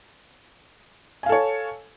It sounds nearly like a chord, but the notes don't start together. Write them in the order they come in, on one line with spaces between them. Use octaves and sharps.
G#5 F5 A4 C#5